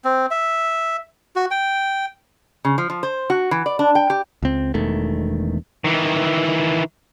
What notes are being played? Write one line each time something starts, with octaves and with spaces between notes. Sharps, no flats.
C4
E5
F#4
G5
C#3
F3
F3
C5
F#4
E3
D5
D4
G5
G4
C#2 C4
E1 E2 D#3 A3
D#3 E3